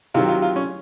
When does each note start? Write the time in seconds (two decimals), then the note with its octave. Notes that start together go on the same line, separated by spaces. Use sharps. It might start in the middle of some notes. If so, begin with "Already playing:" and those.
0.14 C3 D#3 F#3 F4
0.28 F4
0.42 F4
0.56 C#4